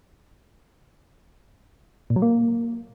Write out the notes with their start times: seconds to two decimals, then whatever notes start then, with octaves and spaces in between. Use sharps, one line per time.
2.10 A#2
2.16 F#3
2.22 A#3